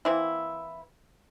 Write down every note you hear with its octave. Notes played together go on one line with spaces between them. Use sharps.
E3 A#3 C4 E4